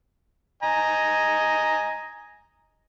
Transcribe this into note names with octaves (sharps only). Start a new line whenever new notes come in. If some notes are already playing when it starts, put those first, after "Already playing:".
D#5 G#5 A#5